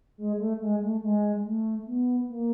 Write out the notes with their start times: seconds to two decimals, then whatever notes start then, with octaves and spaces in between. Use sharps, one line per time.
0.18 G#3
0.39 A3
0.61 G#3
0.82 A3
1.02 G#3
1.45 A3
1.87 B3
2.29 A#3